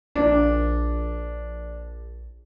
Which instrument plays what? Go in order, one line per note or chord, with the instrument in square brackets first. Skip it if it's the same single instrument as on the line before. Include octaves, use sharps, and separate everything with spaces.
[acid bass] A#1 [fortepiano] D4